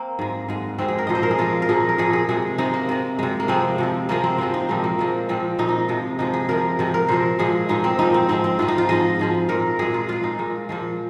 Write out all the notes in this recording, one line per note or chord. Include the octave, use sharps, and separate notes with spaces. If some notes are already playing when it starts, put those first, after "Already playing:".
Already playing: A#3 C4
G#2 G#3
G#2 G#3
G#2 G#3 C4
G#4
A#4
A#2 F3 G#3 D#5
C5
A#4
G#4
A#2 F3 G#3 F4
A#4
A#2 F3 G#3 G#4
A#4
A#2 F3 G#3 G#4
G#4
C3 G#3 G#4
C3 G#3 D#4
A#3
C3 G#3
C3 G#3
A#3
C3 F3 G#3 C4
C3 F3 G#3
C3 F3 G#3 A#3
C4
C3 F3 G#3 C4
D#4
A#2 F3 G#3 C4
A#3
A#2 F3 G#3
A#2 F3 G#3 C4
A#2 F3 G#3 D#4
D#4
C3 F3 G#3
C3 F3 G#3 D#4
G#4
C3 F3 G#3 A#4
C3 F3 G#3
A#4
A#2 F3 G#3 C5
A#2 F3 G#3 G#4
A#2 F3 G#3 D#4
C4
A#2 F3 G#3 D#4
C4
G#2 F3 G#3 C4
C4
G#2 F3 G#3 F4
D#4
F4
G#2 F3 G#3 D#5
G#2 F3 G#3
A#2 G#3 A#4
A#2 G#3 G#4
F4
A#2 G#3 F4
D#4
A#2 G#3
A#2 F3 G#3